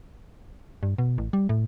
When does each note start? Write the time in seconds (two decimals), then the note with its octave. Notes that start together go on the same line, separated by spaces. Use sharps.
0.83 G2
0.98 B2
1.18 A1
1.33 G3
1.49 A2